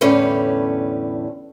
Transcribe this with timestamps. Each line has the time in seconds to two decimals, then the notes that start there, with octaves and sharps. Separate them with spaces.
0.01 E2 A2 D3 G3 C#4 B4